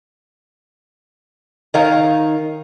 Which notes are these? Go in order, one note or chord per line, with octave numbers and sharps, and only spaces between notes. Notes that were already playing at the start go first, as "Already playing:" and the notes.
D#3 D#4 A#4 C#5 F5 A#5